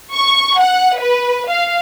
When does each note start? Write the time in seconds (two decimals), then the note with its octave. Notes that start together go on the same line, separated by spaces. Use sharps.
0.14 C#6
0.60 F#5
0.99 B4
1.51 F5